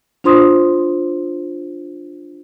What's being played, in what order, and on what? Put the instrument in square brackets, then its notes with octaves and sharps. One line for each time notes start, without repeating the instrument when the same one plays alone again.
[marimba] D4 F4 C5 C6 D#6